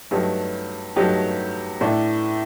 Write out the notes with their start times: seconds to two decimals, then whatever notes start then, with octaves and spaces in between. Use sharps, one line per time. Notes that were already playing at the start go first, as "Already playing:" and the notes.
0.11 G2 F#3 A3 D#4 G4
0.96 G2 F#3 A3 D#4 G4
1.81 A2 A3 D4